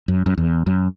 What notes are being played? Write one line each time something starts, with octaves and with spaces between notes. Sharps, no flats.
F#2
F#2
E2
F#2